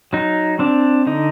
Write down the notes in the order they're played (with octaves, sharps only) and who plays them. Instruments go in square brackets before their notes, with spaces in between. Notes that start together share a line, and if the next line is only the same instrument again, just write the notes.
[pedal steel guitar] F#3 D#4
C4 D4
D3 D#4